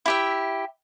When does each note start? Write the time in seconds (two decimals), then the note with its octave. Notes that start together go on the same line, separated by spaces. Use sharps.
0.06 E4 G4 E5